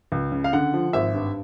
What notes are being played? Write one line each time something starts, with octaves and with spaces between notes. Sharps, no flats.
C#2
C#3
F5
D3 F#5
F3
G#1 E5
G2